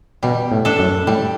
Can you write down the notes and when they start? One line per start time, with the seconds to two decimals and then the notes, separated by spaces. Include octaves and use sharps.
0.23 B2 G3
0.51 A2
0.65 D4 A4 E5
0.79 F#2
1.07 A2 G3